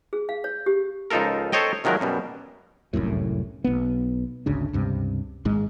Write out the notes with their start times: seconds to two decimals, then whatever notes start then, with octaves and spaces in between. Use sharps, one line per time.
0.13 G#4
0.29 F5
0.44 C#5
0.66 G4
1.11 C#2 F3 D#4 F4 A4 A#4
1.52 A4 C5 C#5 D#5 G5
1.84 C3 D#3 F3 F#3 G#3 A#4
2.01 F#2 B2 G3
2.93 F1 C2 F#2 A2
3.64 B1 B3
4.46 G#1 D2 C#3 D4
4.73 C#2 G2 C3
5.45 G#1 G#2 G#3